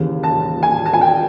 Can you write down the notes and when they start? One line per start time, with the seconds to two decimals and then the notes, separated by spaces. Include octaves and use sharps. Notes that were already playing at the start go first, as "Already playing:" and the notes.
Already playing: D#2 C#3 E3
0.23 A5
0.63 G#5
0.86 A5
0.93 G#5
1.01 G5